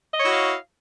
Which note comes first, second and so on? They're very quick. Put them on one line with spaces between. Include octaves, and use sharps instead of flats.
D#5 C#5 E4 F#4 F5